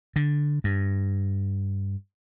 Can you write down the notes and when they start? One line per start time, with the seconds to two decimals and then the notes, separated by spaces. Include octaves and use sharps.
0.16 D3
0.64 G2